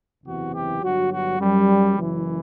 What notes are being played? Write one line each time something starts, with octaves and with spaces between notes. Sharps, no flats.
F#1 E2 C3 E3 F#4
G4
G1 G2 F#3 F#4
F#4
F#2 F#3 G3
F#1 F#2 E3